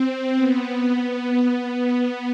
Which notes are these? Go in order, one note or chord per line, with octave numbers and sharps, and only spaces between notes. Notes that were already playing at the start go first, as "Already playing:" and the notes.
Already playing: C4
B3
B3